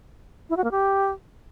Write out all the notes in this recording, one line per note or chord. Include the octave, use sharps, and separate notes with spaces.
E4
F#4
A#3
G4